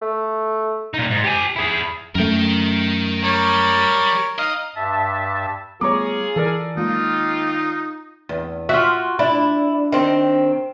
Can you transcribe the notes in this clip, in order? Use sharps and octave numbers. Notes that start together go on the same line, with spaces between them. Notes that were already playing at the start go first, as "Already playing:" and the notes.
A3
A#2 D#4
G#2
G4 G#5
E4 G#4
F#2 A3 A#4 G5
G3 A#4 C#5
D#4 D#5 F5
G2 E5 A5
G3 A3 B3 F4 G#4 C#5 A#5 D6
E3 A4 A#4 D5
D#3 F#3 G#3 A#3 D#4 F4
E2
F4 F#4 E5
D4 E4
D#3 C4